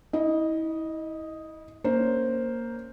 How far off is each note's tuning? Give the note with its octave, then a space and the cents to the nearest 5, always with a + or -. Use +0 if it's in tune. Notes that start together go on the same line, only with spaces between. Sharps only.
E4 -35 D#5 +0
A#3 +0 C#4 +15 C5 +0